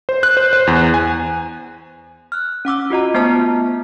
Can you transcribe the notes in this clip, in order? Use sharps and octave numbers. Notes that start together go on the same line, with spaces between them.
C5
F#6
C5
C5
E2
G#5
F6 F#6
C#4 F#5 D6 E6
F4 F#4 D#5 A#5
A3 B3 F4 C5 A5